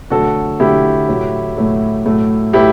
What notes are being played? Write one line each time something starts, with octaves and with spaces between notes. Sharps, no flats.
D3 F#3 A3 F#4 A4
D3 F#3 A3 E4 G4
A2 F#3 A3
A2 F#3 A3
A2 F#3 A3
A2 F#3 A3 E4 G4